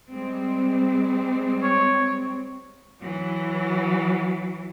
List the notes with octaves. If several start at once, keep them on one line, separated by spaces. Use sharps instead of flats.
G3 G#3 C4
C#5
E3 F#3